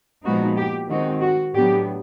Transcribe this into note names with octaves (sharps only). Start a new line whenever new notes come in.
A#2 F3 G#3 B3 D#4 F#4
G4
D#3 G#3 C4 D#4 F#4
F#4
A2 F#3 B3 D4 G4